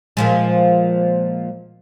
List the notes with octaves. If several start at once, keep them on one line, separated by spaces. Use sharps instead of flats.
A#2 F3 G#3